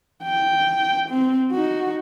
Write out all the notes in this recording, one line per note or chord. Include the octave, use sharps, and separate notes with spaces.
G5
C4
D#4 F#4